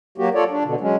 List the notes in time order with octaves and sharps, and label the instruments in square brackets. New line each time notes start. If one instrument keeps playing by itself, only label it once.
[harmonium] F#3 A#3 F#4 G4
F4 A4 C#5 D5
D4
B2 D3
F#3 G#3 C#4